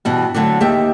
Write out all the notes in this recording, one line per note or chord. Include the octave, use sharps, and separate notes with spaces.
G2 B2 E3
D3 F#3 A3 C4 D4
D#2 G4 E5